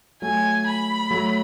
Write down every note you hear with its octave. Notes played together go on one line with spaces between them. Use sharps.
F#3 A3 G#5
B5
F#3 A3